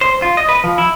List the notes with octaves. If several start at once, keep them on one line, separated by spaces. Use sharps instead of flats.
C5
F4
D#5
B4
F3
E4